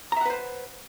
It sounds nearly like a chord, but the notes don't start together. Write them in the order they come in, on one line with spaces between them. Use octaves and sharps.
A#5 E5 F#5 B4 C5